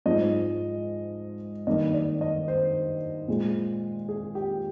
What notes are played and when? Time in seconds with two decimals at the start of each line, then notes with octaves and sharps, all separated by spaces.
0.06 G#2 F3 G#3 D#5
1.67 G2 D#3 A#3 D#5
1.94 D5
2.21 D#5
2.48 C5
3.28 A#2 G#3
4.09 G#4
4.35 G4